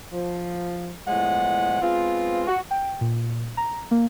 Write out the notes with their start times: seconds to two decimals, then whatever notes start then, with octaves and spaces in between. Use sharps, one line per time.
0.13 F3
1.07 E2 A2 F3 G#3 F#5
1.82 G#3 B3 C4 F4
2.48 F#4
2.71 G5
3.01 A#2
3.57 A#5
3.91 A#3